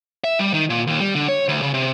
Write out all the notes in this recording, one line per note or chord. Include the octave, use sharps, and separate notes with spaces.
E5
G3
D#3
A#2
D#2
G3
D3
C#5
D2
C#3
C3